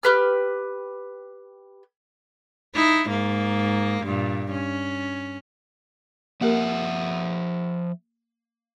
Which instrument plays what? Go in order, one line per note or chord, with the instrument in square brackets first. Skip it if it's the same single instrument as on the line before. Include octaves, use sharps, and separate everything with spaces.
[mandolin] G4 B4 F6
[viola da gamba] D#4 E4
G#2 A#3
G2 A#2
C#4
[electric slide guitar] F3 E5 F#5 [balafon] A#3 G4 A#4